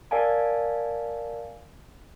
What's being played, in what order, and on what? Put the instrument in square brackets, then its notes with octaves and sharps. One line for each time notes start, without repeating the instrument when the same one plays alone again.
[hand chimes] A#4 D5 F5 G#5 A5